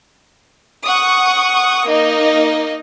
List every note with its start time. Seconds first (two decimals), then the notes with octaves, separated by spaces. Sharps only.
0.85 F#5 C#6 D#6
1.88 A#3 D#4 D#5